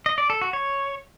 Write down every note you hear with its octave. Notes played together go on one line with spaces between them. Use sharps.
D#5
D5
A4
F#4
C#5